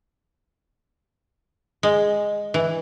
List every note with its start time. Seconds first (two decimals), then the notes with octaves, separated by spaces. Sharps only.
1.83 G#3
2.54 E3